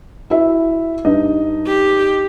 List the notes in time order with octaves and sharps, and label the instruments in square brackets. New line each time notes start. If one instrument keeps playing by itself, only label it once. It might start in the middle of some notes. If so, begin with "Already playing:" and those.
[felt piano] E4 F#4 E5
[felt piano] G2 [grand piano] D#4 D#5
[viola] G4